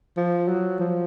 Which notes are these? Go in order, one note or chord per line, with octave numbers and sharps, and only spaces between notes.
F3
F#3
F3